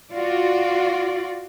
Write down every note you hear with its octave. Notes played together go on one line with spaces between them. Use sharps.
F4 F#4 D5